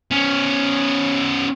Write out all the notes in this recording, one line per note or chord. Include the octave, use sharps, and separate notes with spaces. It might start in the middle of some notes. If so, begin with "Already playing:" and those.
B3 C#4